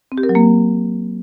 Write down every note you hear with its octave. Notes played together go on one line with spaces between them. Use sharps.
C4
G4
A#4
F#3
A#3